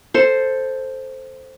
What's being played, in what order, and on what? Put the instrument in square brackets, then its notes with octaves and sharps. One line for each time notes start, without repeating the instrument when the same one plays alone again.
[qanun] A4 C5